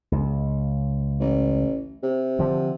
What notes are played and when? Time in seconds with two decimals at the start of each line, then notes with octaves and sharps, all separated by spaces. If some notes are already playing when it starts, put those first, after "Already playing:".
0.12 C#2
1.20 A1
2.03 C3
2.39 D3 F3